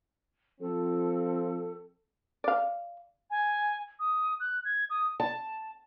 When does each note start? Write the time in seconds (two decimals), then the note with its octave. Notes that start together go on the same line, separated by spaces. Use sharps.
0.61 F3 C4 A4
2.44 D5 F5
3.31 G#5
4.00 D#6
4.40 F#6
4.65 G#6
4.90 D#6
5.20 A5